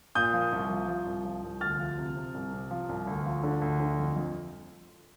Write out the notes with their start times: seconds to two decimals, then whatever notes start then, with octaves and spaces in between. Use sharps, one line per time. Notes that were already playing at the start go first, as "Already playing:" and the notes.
0.15 A#2 D#6 G6
0.33 F3
0.52 C2
0.70 F3
0.88 F3
1.06 C2
1.25 F3
1.43 C2
1.61 D2 F6 A6
1.79 F3
1.98 C3
2.16 C3
2.34 C2
2.53 C3
2.71 F3
2.89 C2
3.07 D2
3.26 F3
3.43 D3
3.62 D2
3.80 D3
3.98 F2
4.16 F2